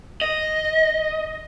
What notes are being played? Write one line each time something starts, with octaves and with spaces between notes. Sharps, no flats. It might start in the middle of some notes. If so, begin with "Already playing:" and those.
D#5